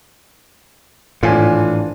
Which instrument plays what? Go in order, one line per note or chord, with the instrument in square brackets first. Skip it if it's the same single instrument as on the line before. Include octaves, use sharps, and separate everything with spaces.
[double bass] G#1 D4 [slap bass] A2 [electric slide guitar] E3 [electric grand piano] F4 G#5